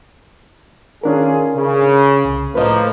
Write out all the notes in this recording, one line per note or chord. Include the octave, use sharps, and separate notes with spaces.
D#3 C#4 D4 F4 G#4 A#4
C#3
C2
A2 F3 A#3 B4 D#5